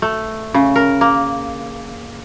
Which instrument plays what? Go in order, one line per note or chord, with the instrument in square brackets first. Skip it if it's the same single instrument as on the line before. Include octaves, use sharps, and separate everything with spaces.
[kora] A3
C#3
A#4
A#3